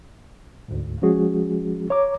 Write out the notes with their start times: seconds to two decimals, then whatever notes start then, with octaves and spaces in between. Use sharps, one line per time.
0.68 D2 G#2
1.02 F3 G#3 C#4 F#4 G#4
1.90 C#5 A#5 D6